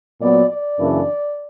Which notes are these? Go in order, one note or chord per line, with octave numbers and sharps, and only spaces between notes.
A#2 F#3 B3 D5
D5
F#2 C#3 E3 A#3 D4